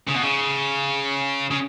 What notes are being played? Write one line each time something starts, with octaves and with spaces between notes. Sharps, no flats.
C#3
B2
C#3
C#3